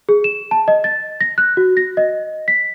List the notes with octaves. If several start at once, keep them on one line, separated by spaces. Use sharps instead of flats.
G#4
E7
A5
D#5
A6
A#6
F#6
F#4
A#6
D#5
B6